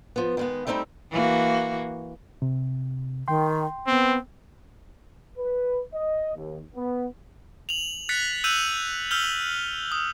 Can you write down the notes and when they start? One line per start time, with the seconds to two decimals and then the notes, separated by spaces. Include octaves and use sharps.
0.16 F3 B3
0.37 D#3 G#3 B3
0.67 G3 A3 C4 D#4 E4
1.11 E3 A#3 F#4
2.42 C3
3.28 D#3 G5 C6
3.87 B3 C4
5.37 B4
5.93 D#5
6.35 D#2
6.74 B3
7.69 F7 F#7
8.09 F#6 A6 B6 C#7
8.44 E6 F#6 G6 D#7 F7 F#7
9.11 E6 F6 G6 F7 G7
9.92 D#6